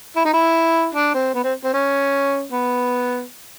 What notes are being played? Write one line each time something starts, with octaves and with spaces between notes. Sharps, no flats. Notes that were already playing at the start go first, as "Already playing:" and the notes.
E4
D#4
E4
D4
C4
B3
C4
C4
C#4
B3